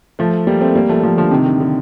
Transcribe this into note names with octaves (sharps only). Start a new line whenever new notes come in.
F3 A3
G3 A#3
A3 C4
G3 A#3
F3 A3
F3 A3
D3 F3
C3 D#3
D3
D3